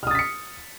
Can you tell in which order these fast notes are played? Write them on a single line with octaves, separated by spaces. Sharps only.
F6 D#6 A6 B6 C#7